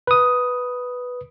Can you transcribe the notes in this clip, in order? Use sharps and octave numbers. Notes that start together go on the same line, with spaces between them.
B4 D#6